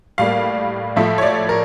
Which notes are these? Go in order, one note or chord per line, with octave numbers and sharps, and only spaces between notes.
A2 G3 A#3 F5
A2 F3 A3 E5
C#5
D5
A#4